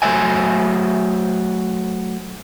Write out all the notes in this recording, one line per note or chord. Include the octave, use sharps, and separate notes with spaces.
F#3 A3 C5 D5 E5 G#5